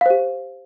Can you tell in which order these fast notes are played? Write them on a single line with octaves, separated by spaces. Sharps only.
F5 C5 G4